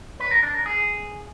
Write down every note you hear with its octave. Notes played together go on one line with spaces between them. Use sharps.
B4
A#4
D4
A#4
G#4